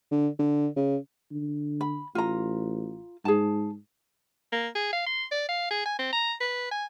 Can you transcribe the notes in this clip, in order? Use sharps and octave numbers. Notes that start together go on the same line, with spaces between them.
D3
D3
C#3
D3
B5
A1 F4 A#5
G#2 G#4 A5
A#3
G#4
F5
C6
D5
F5
G#4
G#5
C4
A#5
B4
G#5